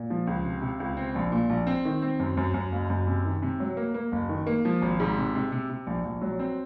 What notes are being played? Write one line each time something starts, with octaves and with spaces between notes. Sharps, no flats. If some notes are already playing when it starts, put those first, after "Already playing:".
Already playing: A#2
F3
C#2
C3
C3
C#2
C4
A#1
A#2
A#1
C4
D#3
C4
F#2
F#2
F#2
F#1
F#2
C3
D#3
C3
F#3
A#3
A#3
F#1
D#3
A#3
F3
G#1
G#2
C3
C3
C3
C3
A#1
A#1
F#3
C4